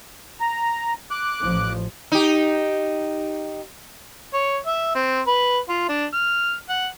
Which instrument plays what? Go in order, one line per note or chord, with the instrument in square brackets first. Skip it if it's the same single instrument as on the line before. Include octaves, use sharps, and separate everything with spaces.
[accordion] A#5
D6 F#6
[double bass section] A1 F3
[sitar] D#4 G4
[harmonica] C#5
E5
C4
B4
F4
D4
F6
F#5